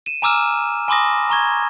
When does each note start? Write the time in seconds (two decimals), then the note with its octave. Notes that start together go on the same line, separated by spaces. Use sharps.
0.06 D#7 E7
0.22 G#5 A#5 D6 E6 F6 E7
0.88 G#5 B5 C6 D6 D#6 A#6
1.30 A#5 C#6 G#6